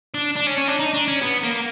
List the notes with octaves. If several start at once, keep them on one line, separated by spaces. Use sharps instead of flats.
D4
D4
C#4
C#4
D4
D#4
D4
C#4
B3
A#3